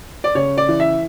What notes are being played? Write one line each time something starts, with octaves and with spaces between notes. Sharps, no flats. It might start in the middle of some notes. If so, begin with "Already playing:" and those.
D5
C#3 C#5
D5
E3
E5